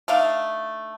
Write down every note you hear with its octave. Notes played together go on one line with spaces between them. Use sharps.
A3 D4 D#4 F5